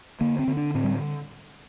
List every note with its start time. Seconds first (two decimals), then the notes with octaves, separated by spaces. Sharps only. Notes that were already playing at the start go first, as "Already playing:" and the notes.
0.21 D3 A#3
0.39 C4
0.48 D3
0.57 D4
0.74 A2 C4
0.84 G3